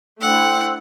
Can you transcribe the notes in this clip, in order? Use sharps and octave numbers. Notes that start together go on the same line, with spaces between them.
A3 D4 E4 C5 F#5 G5 E6